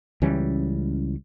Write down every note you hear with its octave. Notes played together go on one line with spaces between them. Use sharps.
C#2 E3 G3 C#4